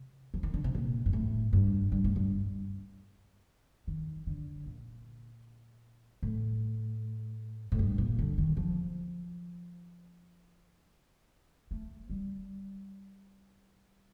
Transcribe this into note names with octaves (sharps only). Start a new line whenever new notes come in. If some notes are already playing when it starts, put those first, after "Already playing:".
Already playing: C3
F3
D#3
D3
C3
A#2
G2
A2
G2
G2
A2
G2
D#3
D3
A#2
A2
A2
G2
A#2
D3
D#3
F3
A3
G3